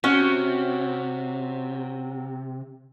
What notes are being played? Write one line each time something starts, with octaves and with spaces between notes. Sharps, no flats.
C3 C#4 F#4